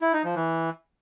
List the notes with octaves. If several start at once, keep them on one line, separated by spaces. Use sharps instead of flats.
E4
D#4
F3
E3